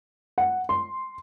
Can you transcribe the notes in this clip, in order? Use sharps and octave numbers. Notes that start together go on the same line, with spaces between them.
F#5
C6